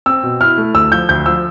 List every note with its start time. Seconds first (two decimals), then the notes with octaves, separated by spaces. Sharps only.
0.06 C4 E6
0.23 B2
0.41 E4 F6
0.58 A3
0.74 D2 E6
0.92 F3 G6
1.09 D2 G6
1.26 F3 E6